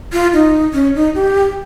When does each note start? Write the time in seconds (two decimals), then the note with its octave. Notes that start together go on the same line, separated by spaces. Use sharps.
0.13 F4
0.33 D#4
0.74 C#4
0.95 D#4
1.15 G4